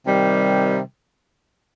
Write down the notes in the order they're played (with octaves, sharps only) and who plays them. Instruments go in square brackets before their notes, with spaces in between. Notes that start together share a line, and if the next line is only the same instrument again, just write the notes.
[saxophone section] C3 D#3 G3